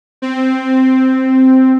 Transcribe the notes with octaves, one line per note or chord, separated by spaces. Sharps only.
C4